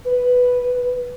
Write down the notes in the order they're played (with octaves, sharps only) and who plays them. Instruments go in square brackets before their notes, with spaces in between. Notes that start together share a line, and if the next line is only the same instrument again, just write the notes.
[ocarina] B4